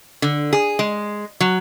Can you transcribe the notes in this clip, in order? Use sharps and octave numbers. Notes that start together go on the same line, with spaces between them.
D3
G#4
G#3
F#3